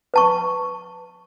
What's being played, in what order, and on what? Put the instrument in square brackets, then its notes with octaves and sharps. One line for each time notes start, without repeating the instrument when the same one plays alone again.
[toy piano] B4 A5 C#6